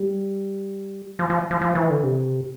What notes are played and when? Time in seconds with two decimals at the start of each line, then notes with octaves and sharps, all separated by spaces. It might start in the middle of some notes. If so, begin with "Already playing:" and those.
Already playing: G3
1.19 F3
1.30 F3
1.51 F3
1.61 F3
1.75 E3
1.90 D3
2.03 C3